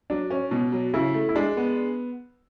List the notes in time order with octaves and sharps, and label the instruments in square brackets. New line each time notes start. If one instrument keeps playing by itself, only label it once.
[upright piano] F#3 [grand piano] D4
[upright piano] C#4
B2
F#3
[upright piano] C#3 [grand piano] E4
[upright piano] A3
[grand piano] E4
[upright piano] G#3 [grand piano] D4
[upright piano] B3